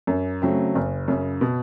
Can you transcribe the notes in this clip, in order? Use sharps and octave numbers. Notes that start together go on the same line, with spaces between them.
F#2
C#3 F#3 A3 C4
F#1
F#2 C#3
B2